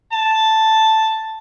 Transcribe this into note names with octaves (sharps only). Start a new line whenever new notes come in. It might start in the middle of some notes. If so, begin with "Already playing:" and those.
A5